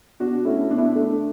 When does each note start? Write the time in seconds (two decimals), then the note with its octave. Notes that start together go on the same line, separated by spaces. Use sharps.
0.20 B2 D4 F#4
0.45 A3 C#4 E4
0.71 B2 D4
0.78 E4
0.85 D4
0.95 A3